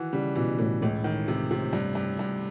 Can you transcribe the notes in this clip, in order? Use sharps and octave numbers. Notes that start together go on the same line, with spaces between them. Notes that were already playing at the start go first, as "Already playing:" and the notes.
Already playing: D#3 E3 F#4
C#3 G3
B2 E3
A2 E3
C#2 A2
D#3
C3
C3
G2
G2
G2